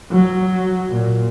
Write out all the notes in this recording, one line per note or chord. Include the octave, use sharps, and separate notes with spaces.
F#3
A#2